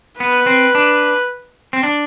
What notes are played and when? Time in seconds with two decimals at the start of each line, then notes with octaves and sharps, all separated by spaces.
0.20 B3 B4
0.47 C4
0.75 D4
1.73 C4
1.83 D4